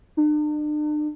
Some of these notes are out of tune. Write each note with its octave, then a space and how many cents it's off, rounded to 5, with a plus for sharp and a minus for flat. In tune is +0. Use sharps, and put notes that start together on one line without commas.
D4 +40